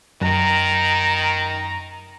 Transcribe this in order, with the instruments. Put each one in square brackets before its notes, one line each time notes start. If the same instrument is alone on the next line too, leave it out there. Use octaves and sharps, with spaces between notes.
[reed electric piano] F#2 [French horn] D#3 [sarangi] A#5